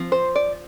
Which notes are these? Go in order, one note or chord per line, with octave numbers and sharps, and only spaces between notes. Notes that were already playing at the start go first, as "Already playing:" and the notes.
Already playing: F3 C4
C5
D5